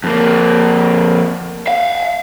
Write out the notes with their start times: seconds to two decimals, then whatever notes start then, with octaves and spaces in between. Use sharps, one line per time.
0.04 F2 A#3
1.67 E5 F5